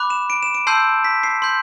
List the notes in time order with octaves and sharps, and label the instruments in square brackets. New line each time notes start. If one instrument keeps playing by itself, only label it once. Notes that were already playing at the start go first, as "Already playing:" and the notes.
Already playing: [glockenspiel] B5 D6 F#6
E7
D7
E7
D7
A5 C6 E6 G6 C7
B6
C7
C6 G6